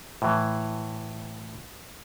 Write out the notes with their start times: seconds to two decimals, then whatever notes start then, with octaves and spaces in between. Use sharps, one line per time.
0.22 A2 E3